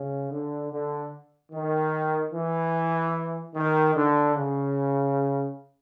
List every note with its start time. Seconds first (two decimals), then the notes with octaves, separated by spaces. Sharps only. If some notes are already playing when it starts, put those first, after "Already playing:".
Already playing: C#3
0.30 D3
0.71 D3
1.52 D#3
2.33 E3
3.55 D#3
3.95 D3
4.36 C#3